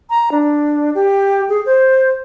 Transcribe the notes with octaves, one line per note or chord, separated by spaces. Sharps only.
A#5
D4
G4
G#4
C5